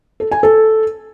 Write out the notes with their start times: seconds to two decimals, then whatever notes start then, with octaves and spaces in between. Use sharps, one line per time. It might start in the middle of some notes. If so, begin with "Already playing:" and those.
0.20 A4
0.32 G#5
0.43 A4